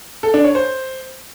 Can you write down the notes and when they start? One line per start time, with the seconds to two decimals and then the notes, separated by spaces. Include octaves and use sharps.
0.23 A4
0.34 D4
0.44 C#5
0.55 C5